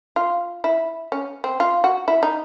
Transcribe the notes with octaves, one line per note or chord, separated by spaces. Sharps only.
F4
E4
C#4
C4
F4
F#4
E4
D#4